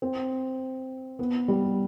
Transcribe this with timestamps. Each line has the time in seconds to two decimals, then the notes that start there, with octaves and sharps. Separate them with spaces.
0.02 C4
1.19 B3
1.48 G3